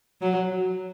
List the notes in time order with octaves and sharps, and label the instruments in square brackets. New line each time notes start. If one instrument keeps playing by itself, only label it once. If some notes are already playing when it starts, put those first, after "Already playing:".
[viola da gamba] F#3